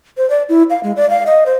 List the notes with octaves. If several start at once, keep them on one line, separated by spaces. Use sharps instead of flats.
C5
D5
E4
F5
G#3
D5
F5
D#5
C5